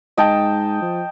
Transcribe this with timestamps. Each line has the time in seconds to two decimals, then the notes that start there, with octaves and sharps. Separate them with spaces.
0.17 G#2 D#5 G5 A5
0.82 F3